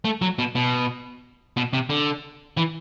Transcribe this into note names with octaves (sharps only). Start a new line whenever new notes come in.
A3
F#3
B2
B2
B2
C3
D3
E3